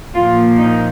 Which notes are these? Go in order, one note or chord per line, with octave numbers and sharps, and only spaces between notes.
A#2 F3 A#3 F4
D#4